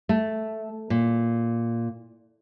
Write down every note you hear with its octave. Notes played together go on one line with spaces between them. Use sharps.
A3
A#2